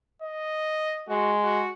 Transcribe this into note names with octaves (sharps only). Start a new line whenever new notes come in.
D#5
G#3 F#4
F#4